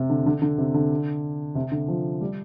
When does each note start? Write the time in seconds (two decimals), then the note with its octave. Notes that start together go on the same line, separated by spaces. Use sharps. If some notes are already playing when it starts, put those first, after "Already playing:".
Already playing: C3
0.10 D3
0.26 D3
0.42 D3
0.58 C3
0.74 D3
1.55 C3
1.72 D3
1.88 F3
2.21 G3